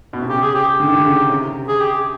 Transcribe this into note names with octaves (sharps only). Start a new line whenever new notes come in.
B2
C3
C#3 G4
G#4
G4
G4
D3
D#3
D3
C#3
C3
G#4
G4